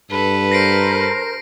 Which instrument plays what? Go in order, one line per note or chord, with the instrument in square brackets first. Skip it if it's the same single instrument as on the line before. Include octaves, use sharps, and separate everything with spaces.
[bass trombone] G2 [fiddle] A4 B4
[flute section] A#4 C5 [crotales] A#6 C7 D7